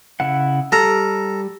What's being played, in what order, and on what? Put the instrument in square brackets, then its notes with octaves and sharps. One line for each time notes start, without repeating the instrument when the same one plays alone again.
[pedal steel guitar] C#3 E4 F#5
[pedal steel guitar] G3 G4 F6 [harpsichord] A4 A#5